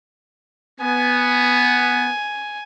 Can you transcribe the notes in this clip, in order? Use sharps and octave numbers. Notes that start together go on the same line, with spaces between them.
B3 G#5